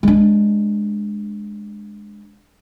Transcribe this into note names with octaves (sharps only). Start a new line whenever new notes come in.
G#3 D4